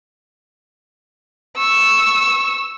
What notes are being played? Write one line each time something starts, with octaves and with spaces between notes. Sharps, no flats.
C#6 E6